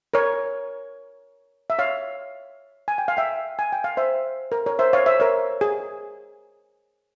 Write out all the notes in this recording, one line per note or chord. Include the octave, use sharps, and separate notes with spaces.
A#4 C#5
E5
C#5 F5
G#5
G5
F5
E5 G5
G#5
G5
F5
C5 E5
A#4
A#4 C#5
C5 E5
C#5 F5
C5 E5
A#4 C#5
G#4